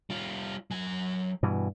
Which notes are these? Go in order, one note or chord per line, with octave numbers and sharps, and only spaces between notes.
G3 F4
F#3 G#5
G2 B2 E3